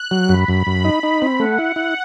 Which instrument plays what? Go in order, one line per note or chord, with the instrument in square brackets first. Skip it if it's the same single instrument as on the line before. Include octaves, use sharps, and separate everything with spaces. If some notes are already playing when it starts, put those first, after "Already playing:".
Already playing: [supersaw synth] F#6
[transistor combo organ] F#3
[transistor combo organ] F#2 [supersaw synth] B5
[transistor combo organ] F#2
F#2
D#4
D#4
C4
[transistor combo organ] A3 [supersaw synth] F#5
[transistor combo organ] E4
E4